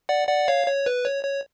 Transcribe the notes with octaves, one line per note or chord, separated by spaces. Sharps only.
D5 F#5
D5 F#5
C#5 F5
C#5
B4
C#5
C#5